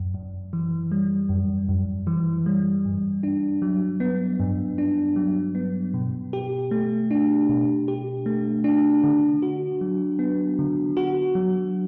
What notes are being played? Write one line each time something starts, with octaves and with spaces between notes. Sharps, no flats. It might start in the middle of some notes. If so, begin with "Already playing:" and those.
Already playing: F#2
F#2
E3
G3
F#2
F#2
E3
G3
G2
D4
F#3
B3
G2
D4
F#3
B3
B2
G4
A3
D4
B2
G4
A3
D4
D3
F#4
F#3
B3
D3
F#4
F#3